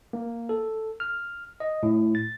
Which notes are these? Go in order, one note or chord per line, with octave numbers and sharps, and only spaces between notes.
A#3
A4
F6
D#5
A2
A6